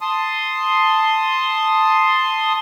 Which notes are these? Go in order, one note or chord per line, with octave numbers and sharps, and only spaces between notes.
A5 C6 D#6